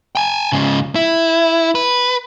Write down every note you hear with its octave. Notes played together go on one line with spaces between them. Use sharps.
G5 G#5
G#2 C#3
E4
B4